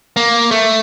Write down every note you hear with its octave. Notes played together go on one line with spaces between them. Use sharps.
A#3
A3